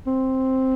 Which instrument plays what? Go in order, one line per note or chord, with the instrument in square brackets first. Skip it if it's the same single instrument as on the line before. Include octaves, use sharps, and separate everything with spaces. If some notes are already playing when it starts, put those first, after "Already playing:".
[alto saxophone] C4